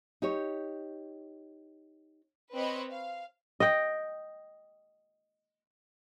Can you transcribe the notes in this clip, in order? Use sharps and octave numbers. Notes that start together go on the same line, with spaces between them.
D#4 G4 C#5
C4 B4 C#5 D#5 B5
F5
D#5 G5